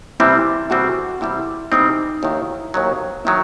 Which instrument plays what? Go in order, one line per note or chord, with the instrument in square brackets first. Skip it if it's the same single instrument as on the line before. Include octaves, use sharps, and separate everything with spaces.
[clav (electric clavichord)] C3 E3 G3 C4 [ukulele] E4
[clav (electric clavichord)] C3 E3 G3 C4 [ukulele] F#4
[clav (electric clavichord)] C3 E3 G3 C4 [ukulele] E4
[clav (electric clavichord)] C3 E3 G3 C4 [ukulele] D#4
[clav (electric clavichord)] D#2 D#3 F#3 [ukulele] E4
[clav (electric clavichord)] D#2 D#3 F#3
[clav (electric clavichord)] D#3 F#3 [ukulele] E4